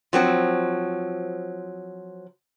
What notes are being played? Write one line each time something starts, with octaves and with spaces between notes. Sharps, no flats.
F3 F#3 C4